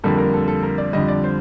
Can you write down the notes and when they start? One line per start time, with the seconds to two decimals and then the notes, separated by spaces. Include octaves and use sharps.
0.04 F2 D3 G3 A#3 A4
0.18 A#4
0.34 A4
0.48 A4
0.63 A#4
0.78 D5
0.93 F2 D3 G3 D#5
1.08 D5
1.24 C5